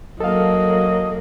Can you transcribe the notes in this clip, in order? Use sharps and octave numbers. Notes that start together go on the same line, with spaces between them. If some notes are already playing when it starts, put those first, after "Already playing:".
F#3 A#3 A4 D#5 F5